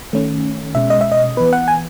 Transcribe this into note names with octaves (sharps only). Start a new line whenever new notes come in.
D#3 A3 C#4
B2 G#3 C#4 E5
D#5
E5
D#5
E3 B3 B4
F#5
G#5